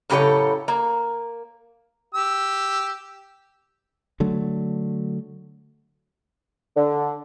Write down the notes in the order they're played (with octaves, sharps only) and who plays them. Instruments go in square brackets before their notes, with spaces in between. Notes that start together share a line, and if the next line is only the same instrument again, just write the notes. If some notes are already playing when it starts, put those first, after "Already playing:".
[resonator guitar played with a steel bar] F#2 A2 C#3 G4 A4 C#5
A#3
[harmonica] G4 E6
[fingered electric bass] D3 F#3 A3
[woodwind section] D3